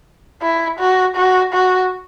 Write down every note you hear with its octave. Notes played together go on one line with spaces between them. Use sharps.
E4
F#4
F#4
F#4